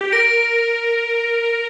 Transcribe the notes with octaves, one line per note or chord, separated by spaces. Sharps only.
G4
A#4 A#6 D7